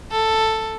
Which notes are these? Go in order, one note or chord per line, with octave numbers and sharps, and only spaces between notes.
A4